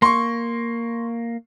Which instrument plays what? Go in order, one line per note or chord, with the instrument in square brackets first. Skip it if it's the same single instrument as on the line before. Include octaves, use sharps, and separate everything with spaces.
[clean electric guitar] A#3 [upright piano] C6 C#6